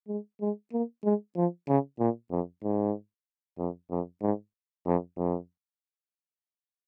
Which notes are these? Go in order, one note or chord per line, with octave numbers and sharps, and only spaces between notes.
G#3
G#3
A#3
G#3
F3
C#3
A#2
F2
G#2
F2
F2
G#2
F2
F2